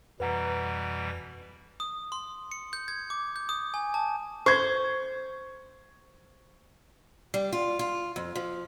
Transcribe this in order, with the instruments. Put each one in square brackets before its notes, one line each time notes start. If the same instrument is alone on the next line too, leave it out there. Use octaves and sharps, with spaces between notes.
[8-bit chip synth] F2 [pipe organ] B2 E3 G3 [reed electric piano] B4 F#5 A#5
[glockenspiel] D#6
C6
C#7
G6
G#6
D6
G6
D#6
G#5
A5
[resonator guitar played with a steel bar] C5 [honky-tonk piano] C#6 G#6
[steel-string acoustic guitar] G3
F4
F4
F2
F3